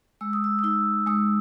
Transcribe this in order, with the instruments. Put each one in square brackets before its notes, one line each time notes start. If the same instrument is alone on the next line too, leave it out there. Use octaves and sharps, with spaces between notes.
[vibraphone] G#3 E6
D#6
E6
D#6
D#4 E6
G#3 D#6